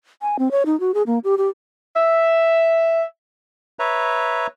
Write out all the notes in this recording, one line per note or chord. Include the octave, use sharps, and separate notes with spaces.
G#5
C4
C#5
D#4
F#4
G#4
A#3
G4
G4
E5
B4 C#5 E5 A#5